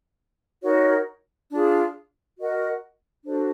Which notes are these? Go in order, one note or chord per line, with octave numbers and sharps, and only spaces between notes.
D#4 F#4 A#4 C#5
D4 F4 G#4
F#4 A#4 D#5 F#5
D4 F#4 A4 C5